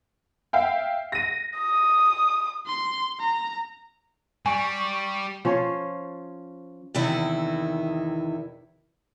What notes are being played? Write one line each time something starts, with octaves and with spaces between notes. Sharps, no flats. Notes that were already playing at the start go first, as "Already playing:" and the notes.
E5 F5 G5
A#6 D#7
D#6
C6
A#5
G3 G#5 C#6
F3 C#4 C5 C#5
E2 C3 D#3 E4